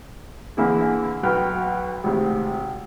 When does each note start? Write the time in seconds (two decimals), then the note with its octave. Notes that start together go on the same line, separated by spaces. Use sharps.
0.57 D3 E3 A#3 E4 G#4
1.23 B1 F#4 B4 G5 F6
2.04 G#1 A2 C3